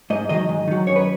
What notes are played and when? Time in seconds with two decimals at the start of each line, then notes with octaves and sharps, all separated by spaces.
0.10 G#2 D#5
0.29 D#3 F#3 D#5
0.49 G#2
0.68 D#3 F#3
0.87 F#2 C#5
0.96 B4